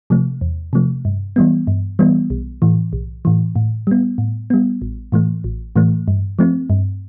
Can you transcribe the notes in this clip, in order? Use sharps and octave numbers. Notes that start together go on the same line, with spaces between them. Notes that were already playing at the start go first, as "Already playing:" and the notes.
C3 F3 A3
E2
C3 F3 A3
G2
E3 G3 B3
G2
E3 G3 B3
B1
A2 E3
B1
A2 E3
A2
G3 B3
A2
G3 B3
A1
A2 E3 A3
A1
A2 E3 A3
G2
F3 A3 C4
G2